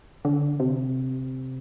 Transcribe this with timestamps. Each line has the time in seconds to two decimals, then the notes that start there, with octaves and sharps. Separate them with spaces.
0.25 D3
0.60 C3